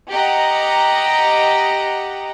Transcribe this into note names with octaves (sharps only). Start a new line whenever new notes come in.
G4 D#5 F#5 A#5